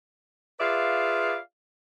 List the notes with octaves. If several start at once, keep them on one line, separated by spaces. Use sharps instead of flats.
F4 G#4 B4 D5 E5 F5